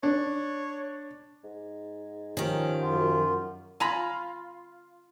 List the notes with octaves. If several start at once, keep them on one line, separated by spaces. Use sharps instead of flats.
D4 C#5
G#2
D#3 F3 C#4 G4
F#2 F4 F#4
F4 G#5 A#5 B5